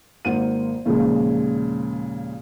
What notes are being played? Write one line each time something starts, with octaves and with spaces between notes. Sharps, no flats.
G#1 A#3 F4 C5 F#5 D#7
D#2 A#2 C#3 F3 G#3